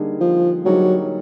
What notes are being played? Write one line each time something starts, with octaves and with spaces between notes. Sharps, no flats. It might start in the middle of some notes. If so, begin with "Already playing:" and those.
Already playing: D3 G3 A#3 D#4 G#4
F3
D3 F#3 G3 A#3 D#4 G#4